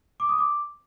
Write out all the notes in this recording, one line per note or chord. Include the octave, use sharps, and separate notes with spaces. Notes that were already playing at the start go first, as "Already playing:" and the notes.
D6
D#6
D6